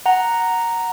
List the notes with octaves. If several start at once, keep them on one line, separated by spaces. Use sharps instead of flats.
F#5 A#5